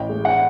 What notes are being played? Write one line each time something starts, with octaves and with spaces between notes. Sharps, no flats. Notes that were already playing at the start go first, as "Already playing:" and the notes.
Already playing: A1 G5
G#3
F#5